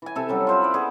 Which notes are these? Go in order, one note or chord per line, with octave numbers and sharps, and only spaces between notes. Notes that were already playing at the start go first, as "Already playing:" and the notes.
E3 G#5
C3 A4 E5
F#3 G3 C#4
F4 C5 B5
E4 D5
B3 G#4 D5